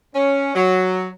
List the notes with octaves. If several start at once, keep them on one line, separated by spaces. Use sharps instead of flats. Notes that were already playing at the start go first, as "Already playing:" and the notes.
C#4
F#3